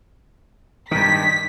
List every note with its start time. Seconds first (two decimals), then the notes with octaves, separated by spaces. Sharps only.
0.91 G2 D#3 B6